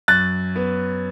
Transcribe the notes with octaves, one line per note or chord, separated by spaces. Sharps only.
F#2 F#6 A6
B3